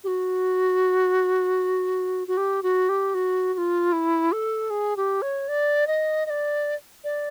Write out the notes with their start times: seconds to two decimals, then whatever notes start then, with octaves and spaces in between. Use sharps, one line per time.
0.04 G4
0.07 F#4
2.27 F#4
2.37 G4
2.63 F#4
2.89 G4
3.14 F#4
3.54 F#4
3.58 F4
3.92 E4
4.32 A4
4.70 G#4
4.97 G4
5.22 C#5
5.48 D5
5.87 D#5
6.26 D#5
6.30 D5
7.04 D5